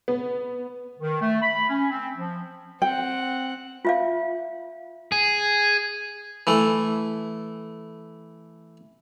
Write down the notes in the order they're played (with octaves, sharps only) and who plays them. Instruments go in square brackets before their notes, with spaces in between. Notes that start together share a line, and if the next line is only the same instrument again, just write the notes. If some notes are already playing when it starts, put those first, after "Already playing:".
[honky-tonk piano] B3
[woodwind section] D#3
A3
B5
C#4
C4
F3
[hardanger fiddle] C4 F#5 [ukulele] G5
[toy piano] F4 E5 F5
[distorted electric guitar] G#4
[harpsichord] E3 A3